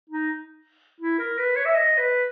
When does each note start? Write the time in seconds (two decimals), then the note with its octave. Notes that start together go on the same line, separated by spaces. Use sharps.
0.10 D#4
1.01 E4
1.19 A#4
1.38 B4
1.56 C#5
1.65 E5
1.74 D#5
1.98 B4